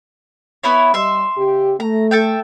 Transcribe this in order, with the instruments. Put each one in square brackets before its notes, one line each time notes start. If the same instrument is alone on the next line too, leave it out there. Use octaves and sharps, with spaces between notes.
[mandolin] B3 E4 C#5
[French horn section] G3 D#5 [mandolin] E5 C6
[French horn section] C#3 G4
[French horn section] A3 [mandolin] A#5
[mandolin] A4 E5 G5